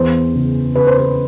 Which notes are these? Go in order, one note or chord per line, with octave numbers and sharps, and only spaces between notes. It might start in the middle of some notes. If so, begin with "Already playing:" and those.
Already playing: E2 C5
C#3
C#3 B4
C5
B4